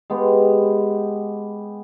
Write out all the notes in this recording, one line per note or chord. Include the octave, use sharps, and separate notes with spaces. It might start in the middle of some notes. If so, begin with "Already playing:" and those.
G#3 B3 G4